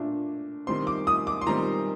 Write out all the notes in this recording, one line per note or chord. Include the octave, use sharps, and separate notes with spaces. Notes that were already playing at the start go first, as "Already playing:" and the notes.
Already playing: A#2 A3 D4
D#3 G3 C4 C6
D6
D#6
D6
C6
D#3 G3 C4 A#5